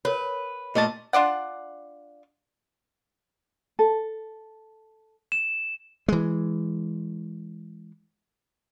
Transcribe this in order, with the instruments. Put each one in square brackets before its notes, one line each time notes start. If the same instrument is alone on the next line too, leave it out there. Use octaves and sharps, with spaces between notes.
[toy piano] A#4 C#5 [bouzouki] B4
[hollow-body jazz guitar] A#2 A3 A5 [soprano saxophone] D#5
[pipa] D4 F4 D5 F#5
[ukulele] A4
[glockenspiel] E7
[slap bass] E3 G#3